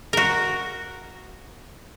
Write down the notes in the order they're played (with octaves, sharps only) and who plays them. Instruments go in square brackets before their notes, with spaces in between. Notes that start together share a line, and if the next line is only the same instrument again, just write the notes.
[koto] F#4 A#4